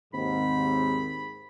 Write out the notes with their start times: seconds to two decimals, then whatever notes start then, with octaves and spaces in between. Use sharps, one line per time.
0.14 D#2 G#2 C4 B5